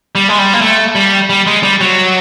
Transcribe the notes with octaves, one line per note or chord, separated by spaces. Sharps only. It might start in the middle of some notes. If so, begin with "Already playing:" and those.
G3
G#3
G3
A#3
A3
G3
G3
G#3
G3
F#3